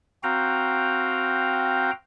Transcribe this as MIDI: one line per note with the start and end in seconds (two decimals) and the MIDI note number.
0.23 1.91 60
0.23 1.91 66
0.23 1.91 77
0.23 1.91 79
0.23 1.91 82